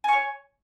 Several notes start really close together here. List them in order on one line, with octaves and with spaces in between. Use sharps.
G#5 C#6 C#5